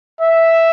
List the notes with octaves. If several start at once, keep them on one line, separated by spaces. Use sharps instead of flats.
E5